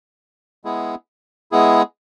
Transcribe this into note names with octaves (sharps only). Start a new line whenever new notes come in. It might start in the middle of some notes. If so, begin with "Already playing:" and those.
G#3 B3 E4 G#4
G#3 B3 E4 G#4